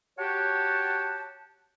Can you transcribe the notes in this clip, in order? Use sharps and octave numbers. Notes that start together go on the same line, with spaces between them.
F#4 G4 C#5 F#5 G5 A5